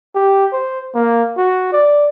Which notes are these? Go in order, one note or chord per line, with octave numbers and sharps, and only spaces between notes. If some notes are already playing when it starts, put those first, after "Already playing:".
G4
C5
A#3
F#4
D5